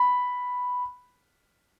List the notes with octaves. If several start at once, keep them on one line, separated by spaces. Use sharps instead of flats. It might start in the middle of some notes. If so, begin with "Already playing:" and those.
Already playing: B5